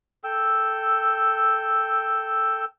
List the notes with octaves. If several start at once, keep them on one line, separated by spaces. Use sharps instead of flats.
A4 G5 E6